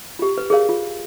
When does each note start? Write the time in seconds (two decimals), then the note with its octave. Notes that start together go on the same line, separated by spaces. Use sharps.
0.19 F4 G4
0.38 B4
0.50 G#4 A#4 C#5 F5
0.69 F4